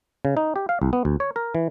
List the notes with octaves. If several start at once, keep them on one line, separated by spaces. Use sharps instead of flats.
C#3
D#4
G4
F5
C2
B3
D2
C#5
A#4
E3